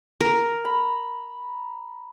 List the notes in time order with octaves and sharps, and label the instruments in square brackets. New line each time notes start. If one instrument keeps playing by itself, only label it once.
[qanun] A#4
[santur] A#5 B5